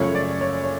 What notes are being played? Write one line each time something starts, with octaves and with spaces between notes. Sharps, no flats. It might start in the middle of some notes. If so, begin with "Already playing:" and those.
Already playing: F#2 C#3 F3 A3 C#4 C#5
D5
C#5
C#5